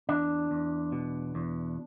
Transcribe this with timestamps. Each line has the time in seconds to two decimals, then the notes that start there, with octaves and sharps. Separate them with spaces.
0.09 E2 D4
0.51 E2
0.92 B2
1.35 E2